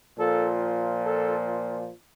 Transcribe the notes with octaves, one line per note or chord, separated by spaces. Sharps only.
A#2 F3 A4
A4